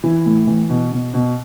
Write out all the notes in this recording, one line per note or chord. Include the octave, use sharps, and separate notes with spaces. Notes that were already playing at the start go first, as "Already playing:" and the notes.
E3 E4
A2
E3
B2
B2
B2